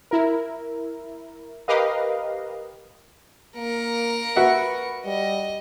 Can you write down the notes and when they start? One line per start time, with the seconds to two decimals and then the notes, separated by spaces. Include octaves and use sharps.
0.11 E4 A#4
1.68 G4 A#4 B4 D#5 F5
3.57 A#3 A#4 C#7
4.36 F#4 B4 E5 F#5
5.05 G3 D#5